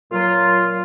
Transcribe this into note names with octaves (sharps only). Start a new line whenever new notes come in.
A#2 F#3 F4